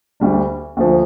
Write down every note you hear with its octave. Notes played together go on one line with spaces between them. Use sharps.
D2 D3 G3 D4
D2 D3 F3